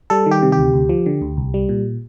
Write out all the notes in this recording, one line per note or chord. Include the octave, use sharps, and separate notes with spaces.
G3 A4
D#3
G4
C3
G4
D2
D2
F3
D3
D2
C2
G3
A#2